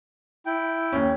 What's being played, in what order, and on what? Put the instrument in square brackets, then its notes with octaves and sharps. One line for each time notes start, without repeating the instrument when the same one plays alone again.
[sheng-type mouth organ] E4 G5
[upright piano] D#2 C#4